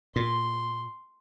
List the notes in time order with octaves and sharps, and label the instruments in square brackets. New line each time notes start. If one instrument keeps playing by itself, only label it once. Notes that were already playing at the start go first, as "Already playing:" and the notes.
[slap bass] A#2 [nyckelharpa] C6